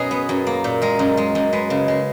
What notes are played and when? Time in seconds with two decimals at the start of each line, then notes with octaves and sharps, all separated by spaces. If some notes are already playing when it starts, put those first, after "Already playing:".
Already playing: F#2 B2 C#4 D#4 F#4 G#4
0.11 B3
0.29 F#2
0.47 A#3
0.64 A#2
0.82 G#3 A#4
0.99 F#2
1.17 G#3
1.35 F#2
1.53 G#3 B4
1.70 C#3
1.88 G#3